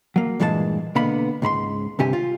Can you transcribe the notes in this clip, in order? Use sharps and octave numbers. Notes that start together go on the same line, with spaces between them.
F#3 A#3
G2 A#2 E3 G#3 B4 A5
B2 D3 A#3 B3 B5
C#2 G#2 B5 C6
G2 C3 G4 G#5
F4